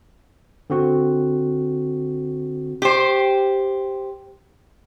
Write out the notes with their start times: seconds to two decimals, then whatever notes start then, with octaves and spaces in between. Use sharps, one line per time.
0.70 D3 C4 F#4
2.82 G4 C5